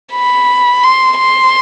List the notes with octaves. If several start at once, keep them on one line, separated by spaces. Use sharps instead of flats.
B5
C6
C6